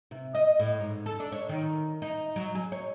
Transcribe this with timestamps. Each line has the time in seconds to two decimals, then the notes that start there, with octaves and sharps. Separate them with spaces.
0.11 C3
0.35 D#5
0.59 A2
0.80 G#2
1.06 A4
1.20 D4
1.32 C#5
1.49 D#3
2.02 D#4
2.36 F#3
2.55 G#4
2.72 C#5